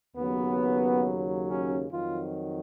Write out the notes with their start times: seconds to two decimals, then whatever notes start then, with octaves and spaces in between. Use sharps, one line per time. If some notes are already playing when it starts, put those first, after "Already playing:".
0.16 D#2 C#3 F#3 B3
1.48 C#4
1.91 F2 D#3 F#3 F4